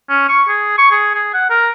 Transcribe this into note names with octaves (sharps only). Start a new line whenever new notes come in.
C#4
C#6
G#4
C#6
G#4
G#4
F#5
A#4